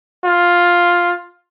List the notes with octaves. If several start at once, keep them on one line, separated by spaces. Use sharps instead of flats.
F4